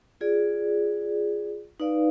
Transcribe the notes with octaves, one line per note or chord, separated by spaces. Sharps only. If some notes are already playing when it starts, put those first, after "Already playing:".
F4 G#4 D5
D#4 B4 D5 F5